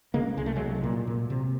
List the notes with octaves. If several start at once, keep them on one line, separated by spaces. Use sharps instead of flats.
C#3 G#3 A#3
C2 G#3
A3
C2 F#3 G#3
A#2
A#2
C3